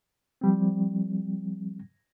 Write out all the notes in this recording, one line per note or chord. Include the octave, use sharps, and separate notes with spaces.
F3 G3 C4